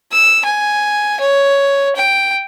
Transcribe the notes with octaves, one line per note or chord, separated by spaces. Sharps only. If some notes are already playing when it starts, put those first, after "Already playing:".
E6
G#5
C#5
G5